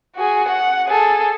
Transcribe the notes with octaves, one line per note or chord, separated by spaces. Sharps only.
F#4 G#4
F#5
G#4 A4